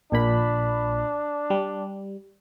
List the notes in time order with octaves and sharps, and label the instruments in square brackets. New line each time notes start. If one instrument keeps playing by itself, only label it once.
[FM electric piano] A#1 A#2 B5 [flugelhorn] D4
[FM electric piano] G3